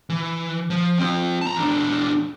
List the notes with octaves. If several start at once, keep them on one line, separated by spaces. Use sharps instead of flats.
E3
F3
C4 F4
A5 A#5
E2 D4